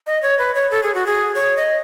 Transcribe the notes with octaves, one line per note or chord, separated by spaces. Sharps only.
D#5
C#5
B4
C#5
A4
G#4
F#4
G#4
C#5
D#5